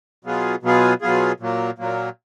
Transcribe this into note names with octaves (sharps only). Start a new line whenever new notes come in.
B2 F#3 B3 F4 G#4
B2 F#3 B3 F4 G#4
B2 F#3 B3 F4 G#4
A#2 F#3 A#3
A#2 F#3 A#3